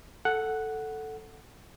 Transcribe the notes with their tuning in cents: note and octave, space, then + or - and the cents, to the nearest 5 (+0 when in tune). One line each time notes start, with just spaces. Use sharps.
A4 +0 F#5 +0